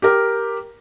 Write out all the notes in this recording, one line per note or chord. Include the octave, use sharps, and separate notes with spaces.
G4 A#4